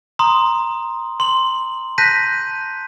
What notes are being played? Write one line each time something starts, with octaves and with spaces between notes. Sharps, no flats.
A#5 C6 D#6
C6 F#7
A5 F#6 G6 A#6 B6 D#7